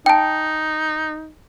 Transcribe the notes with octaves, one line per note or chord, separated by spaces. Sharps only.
D#4 G5 A5